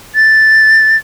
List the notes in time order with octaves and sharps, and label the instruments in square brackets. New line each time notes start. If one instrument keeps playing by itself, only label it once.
[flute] A6